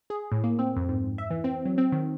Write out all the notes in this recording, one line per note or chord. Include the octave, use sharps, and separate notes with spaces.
G#4
A2
A#3
C4
F2
G#2
E5
E3
C4
F#3
C4
D#3